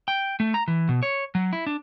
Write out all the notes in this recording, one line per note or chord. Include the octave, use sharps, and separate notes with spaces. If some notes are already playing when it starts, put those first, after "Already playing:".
G5
A3
A#5
E3
B2
C#5
F#3
E4
D4